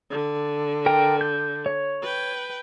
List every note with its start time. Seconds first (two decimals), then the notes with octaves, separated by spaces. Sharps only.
0.10 D3
0.86 A#4 G5
1.21 G6
1.66 C#5
2.02 B4 G5